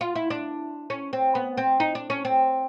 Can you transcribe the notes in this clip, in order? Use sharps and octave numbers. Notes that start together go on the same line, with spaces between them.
F4
E4
D4
C#4
C4
B3
C4
D#4
D4
C#4
C4